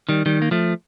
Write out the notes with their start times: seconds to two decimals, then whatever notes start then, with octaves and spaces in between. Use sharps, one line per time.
0.09 D#3 G3
0.26 D#3 G3
0.42 A#3
0.51 F3 A3